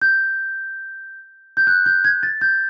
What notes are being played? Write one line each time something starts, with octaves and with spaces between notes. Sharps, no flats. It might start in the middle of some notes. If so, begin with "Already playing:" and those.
G6
G6
F#6
G6
G#6
A6
G6